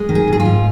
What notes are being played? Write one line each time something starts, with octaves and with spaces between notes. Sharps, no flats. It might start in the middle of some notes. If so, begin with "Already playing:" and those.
Already playing: G#3
D#3
G#4
G#2 G#4
F4
G#2